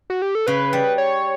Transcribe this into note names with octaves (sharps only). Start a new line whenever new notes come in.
F#4
G4
A4
C#3 B4
G3
C#5